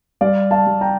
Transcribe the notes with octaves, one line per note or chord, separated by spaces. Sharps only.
G3 D5 F5
F5 A5
G3
G5 A#5